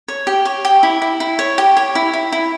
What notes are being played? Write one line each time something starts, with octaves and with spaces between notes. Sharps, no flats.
C#5
G4
C#5
G4
E4
E4
E4
C#5
G4
C#5
E4
E4
E4